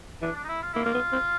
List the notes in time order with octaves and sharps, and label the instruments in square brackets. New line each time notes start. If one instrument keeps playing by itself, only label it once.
[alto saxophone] E3 [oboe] D4
[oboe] D4
D#4
E4
F4
[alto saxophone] A#3 [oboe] E4
[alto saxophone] A#3 [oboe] F4
[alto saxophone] B3
C4